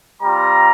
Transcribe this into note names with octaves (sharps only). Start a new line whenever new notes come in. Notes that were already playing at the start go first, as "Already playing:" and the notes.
G3 C4 F4 A#5